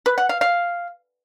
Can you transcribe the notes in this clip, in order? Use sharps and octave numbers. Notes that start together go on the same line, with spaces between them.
B4
F#5
F5
F5